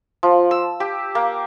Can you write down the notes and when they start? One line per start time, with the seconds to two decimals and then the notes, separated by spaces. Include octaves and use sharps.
0.23 F3
0.51 E6
0.80 G4
1.15 A#3